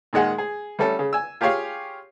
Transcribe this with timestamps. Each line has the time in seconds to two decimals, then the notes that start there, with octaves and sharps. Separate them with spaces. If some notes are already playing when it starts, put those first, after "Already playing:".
0.13 A#2 D#3 G#3 F#5 G#5
0.38 G#4
0.79 G3 A3 C#4 A4
0.99 C#3
1.13 G#5 E6
1.41 F4 G4 G#4 C#5 F5